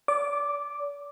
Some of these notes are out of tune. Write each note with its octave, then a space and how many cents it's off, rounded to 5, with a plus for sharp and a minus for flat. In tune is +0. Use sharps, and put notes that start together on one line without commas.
D5 -35 D6 +0